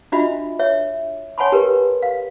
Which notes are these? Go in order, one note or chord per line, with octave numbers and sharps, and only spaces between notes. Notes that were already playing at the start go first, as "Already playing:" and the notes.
D4 F4 F#4 D#5 E5 B5
C#5 E5
C#5 F#5 G#5 A5 B5 C6
G4 A#4 B4
F5